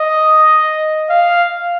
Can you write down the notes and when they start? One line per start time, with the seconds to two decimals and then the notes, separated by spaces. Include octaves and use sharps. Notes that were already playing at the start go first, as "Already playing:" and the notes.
Already playing: D#5
1.10 F5